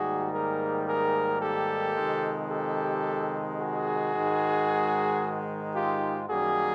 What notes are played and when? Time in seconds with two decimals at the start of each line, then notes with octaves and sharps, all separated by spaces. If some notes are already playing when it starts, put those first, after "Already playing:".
Already playing: G#2 D#3 G3 A#3 F#4 G#4
0.33 G#4 A#4
0.87 G#4 A#4
1.40 G4 A4
1.94 F2 C3 D#3 G#3
2.49 G4 A4
3.57 F#4 G#4
4.11 G#2 D#3 G#3
5.73 F4 G4
6.28 F#2 D#3 G3 A#3 F#4 G#4